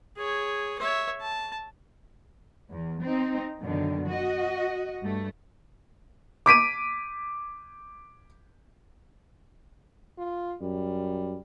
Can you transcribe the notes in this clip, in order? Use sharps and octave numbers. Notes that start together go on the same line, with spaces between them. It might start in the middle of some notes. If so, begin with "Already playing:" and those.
G#4 C#5
C#5 E5
A5
E2
C4 D#4
F#2 B2 D3 D#3
F#4 D#5
G2 A3
D6 B6 D7 D#7
F4
F#2 G3